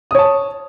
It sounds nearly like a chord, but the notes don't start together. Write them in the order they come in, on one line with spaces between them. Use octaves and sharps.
D#6 C#5 A5